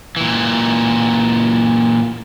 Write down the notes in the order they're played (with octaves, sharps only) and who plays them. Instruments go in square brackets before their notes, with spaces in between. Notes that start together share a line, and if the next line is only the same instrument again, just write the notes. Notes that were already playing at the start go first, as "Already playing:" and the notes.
[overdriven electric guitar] A#2 E3